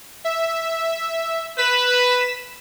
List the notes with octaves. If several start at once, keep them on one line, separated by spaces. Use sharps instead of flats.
E5
B4 B6 E7